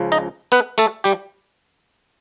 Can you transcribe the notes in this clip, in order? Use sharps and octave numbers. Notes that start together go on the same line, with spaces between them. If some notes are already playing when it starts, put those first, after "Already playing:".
Already playing: C#2 C#3 F3
D#4 D#5
B3 B4
A3 A4
G3 G4